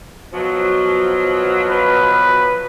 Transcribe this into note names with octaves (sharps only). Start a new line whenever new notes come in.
B2 F3 F#3
B4